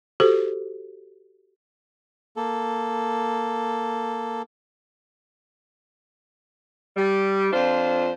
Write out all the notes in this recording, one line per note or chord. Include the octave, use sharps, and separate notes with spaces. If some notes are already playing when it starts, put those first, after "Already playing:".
F#4 G4 A4 C5
A#3 A4
G3
F2 D4 F4 C5